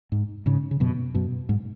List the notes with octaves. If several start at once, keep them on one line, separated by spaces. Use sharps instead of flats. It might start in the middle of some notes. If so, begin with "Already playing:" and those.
G#2
G#2 C#3
C#3
F#2 B2
F#2 B2
G#2